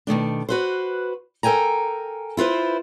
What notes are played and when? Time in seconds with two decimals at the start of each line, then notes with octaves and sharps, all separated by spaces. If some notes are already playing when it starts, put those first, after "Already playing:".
0.07 B2 D#3 A3 D4
0.49 F#4 B4 C5
1.43 A4 A#4 G5 G#5 A#5
2.37 E4 F4 B4 C5